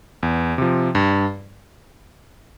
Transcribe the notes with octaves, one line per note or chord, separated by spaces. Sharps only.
E2
C3 F3
G2